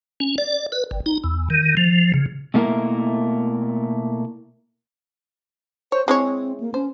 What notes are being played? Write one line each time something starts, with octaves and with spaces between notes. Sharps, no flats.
C#4
D5
B4
G1
D#4
E2
D#3
F3
C#3
B2 A3 A#3 E4 A#4
C5 C#5
G#3 C4 E4 C#5
A#3
C#4 C5